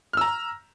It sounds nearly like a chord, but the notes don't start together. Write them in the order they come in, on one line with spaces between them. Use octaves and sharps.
F6 E6 A#5